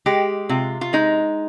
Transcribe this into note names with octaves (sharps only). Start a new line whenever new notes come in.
G#3 G4
C3 F4
F4
G#3 D#4